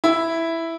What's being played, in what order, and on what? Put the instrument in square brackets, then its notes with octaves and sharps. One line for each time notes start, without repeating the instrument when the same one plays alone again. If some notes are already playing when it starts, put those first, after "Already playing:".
[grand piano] E4